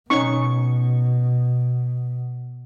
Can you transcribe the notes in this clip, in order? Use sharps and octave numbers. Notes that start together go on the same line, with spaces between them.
B2 C#4 D#4 C#6